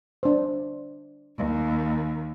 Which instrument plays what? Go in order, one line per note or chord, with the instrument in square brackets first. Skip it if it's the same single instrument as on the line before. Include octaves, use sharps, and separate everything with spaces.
[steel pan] D4 C5
[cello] D#2